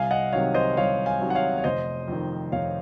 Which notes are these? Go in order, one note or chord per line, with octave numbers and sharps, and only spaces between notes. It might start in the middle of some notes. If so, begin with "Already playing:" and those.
Already playing: C2 F5 G#5
D#5 F#5
C3 D#3 F#3 C#5 F5
C5 D#5
C2 C#5 F5
F5 G#5
C3 D#3 F#3
F#5
C#5 F5
C#5
F1 C5 D#5
F2 D#3
F1 C#5 F5